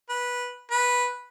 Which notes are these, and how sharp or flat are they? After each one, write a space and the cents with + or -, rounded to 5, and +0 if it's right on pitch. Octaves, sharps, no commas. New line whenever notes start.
B4 -10
B4 -5